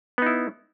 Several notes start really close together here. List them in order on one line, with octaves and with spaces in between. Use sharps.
B3 D#4 E4